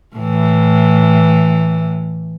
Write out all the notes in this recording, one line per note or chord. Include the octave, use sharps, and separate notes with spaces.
A2 E3